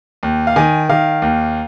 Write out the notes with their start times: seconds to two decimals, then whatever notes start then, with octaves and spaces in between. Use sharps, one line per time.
0.23 D#2
0.47 F5
0.56 D#3 G#5
0.89 D#3 F5
1.22 D#2